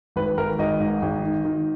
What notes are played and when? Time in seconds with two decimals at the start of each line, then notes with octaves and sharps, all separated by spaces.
0.16 G#1 B4
0.26 B4
0.37 G#1 A#4
0.59 G#1 D#5
0.80 G#2
1.02 G#1
1.24 D#3
1.45 D#3